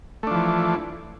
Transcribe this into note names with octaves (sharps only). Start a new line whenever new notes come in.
E3 F3 A3 D4